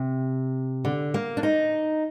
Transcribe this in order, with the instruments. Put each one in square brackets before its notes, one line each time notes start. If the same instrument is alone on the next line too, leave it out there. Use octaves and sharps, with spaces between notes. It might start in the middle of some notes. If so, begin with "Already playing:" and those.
Already playing: [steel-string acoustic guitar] C3
D3
A#3
D4
D#4